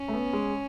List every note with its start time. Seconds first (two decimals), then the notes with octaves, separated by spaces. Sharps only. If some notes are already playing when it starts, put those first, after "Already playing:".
Already playing: C#4
0.08 A3
0.13 B3
0.33 G#3